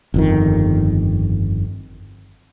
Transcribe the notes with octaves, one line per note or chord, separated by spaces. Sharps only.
G1 F2 D#3